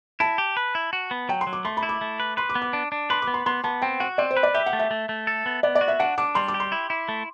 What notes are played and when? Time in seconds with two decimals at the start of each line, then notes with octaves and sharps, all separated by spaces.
0.20 E4 A5
0.38 G4
0.57 B4
0.75 E4
0.93 F#4
1.11 B3
1.29 F#3 G5
1.41 C6
1.47 F#3
1.53 D6
1.65 A3 C6
1.77 B5
1.83 E4
1.89 D6
2.01 A3
2.20 B4
2.37 B4 C6
2.50 D6
2.55 B3
2.62 D6
2.73 D4
2.92 D4
3.10 B4 C6
3.22 D6
3.27 B3
3.34 C6
3.46 B3 C6
3.64 B3 A5
3.82 C4 G5
4.00 F#4 F#5
4.18 C4 D5
4.31 C5
4.37 B4
4.43 D5
4.54 G4 E5
4.66 F#5
4.73 A3
4.79 E5
4.91 A3
5.09 A3
5.27 A4
5.46 B3
5.63 B3 D5
5.75 D5
5.81 F#4
5.88 E5
6.00 D4 F#5
6.18 D4 D6
6.35 G3 C6
6.48 D6
6.54 G4
6.60 C6
6.72 E4
6.90 E4
7.09 A3